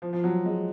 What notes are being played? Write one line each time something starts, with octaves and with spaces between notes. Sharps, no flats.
F3
F3
F#3
G#3